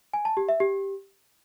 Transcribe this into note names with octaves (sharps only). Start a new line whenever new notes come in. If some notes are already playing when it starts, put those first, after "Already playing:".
G#5
A5
G4
E5
G4